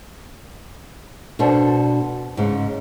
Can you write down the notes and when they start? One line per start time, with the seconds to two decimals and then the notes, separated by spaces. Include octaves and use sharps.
1.39 B2 D4 A4 C5
2.37 G#2 C#3